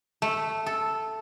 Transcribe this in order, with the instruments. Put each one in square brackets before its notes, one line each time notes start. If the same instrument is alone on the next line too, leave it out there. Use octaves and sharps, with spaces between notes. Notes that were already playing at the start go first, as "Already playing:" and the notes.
[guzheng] A3
A4